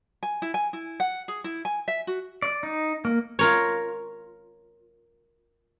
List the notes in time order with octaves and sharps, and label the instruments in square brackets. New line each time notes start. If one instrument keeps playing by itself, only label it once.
[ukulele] G#5
E4
G#5
E4
F#5
G#4
E4
G#5
E5
F#4
[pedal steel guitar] D5
D#4
A#3
[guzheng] F4 A#4 C#5